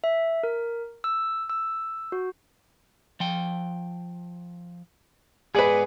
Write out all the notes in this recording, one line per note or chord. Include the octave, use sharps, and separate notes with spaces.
E5
A#4
E6
E6
F#4
F3 G5
G#2 B3 G#4 B4 D5